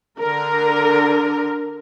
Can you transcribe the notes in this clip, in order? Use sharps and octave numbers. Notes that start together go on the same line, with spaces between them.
D3 A#4